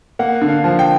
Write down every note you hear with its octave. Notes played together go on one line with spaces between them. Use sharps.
A#3 F#5
D3
F5
F3
G5